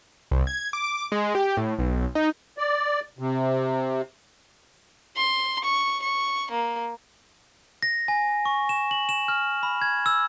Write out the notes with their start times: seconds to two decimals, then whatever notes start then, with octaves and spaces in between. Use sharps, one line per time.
0.31 C2
0.47 G#6
0.73 D6
1.12 G#3
1.35 G4
1.57 A2
1.79 B1
2.15 D#4
2.58 D5
3.19 C3
5.16 C6
5.64 C#6
6.02 C#6
6.51 A#3
7.83 A#6
8.08 G#5
8.45 C#6
8.69 E7
8.91 F#7
9.09 E7
9.28 F6
9.63 B5
9.82 G#6
10.06 E6